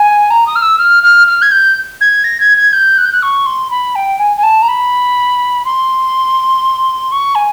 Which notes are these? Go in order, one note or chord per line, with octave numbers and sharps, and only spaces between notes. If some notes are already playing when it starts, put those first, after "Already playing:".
Already playing: G#5
A#5
D#6
F6
E6
F6
F6
F6
G#6
G6
G#6
A#6
G#6
G#6
G6
F#6
G6
F#6
C#6
C6
B5
G5
G#5
G#5
A5
A#5
B5
C6
C#6
G#5